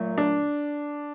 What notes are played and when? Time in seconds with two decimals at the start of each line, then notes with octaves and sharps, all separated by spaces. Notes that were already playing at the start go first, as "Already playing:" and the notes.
Already playing: A#2 F#3 A3
0.18 D4